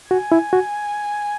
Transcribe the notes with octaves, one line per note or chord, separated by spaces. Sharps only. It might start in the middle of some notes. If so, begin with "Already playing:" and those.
F#4 G#5
E4
F#4